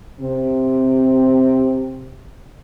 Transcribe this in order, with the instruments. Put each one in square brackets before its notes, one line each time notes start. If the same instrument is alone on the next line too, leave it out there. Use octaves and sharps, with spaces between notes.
[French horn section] C3 C4